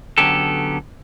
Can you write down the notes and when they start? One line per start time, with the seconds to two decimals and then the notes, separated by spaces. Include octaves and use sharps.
0.18 D3 F#3 B3 C#4 G4 A4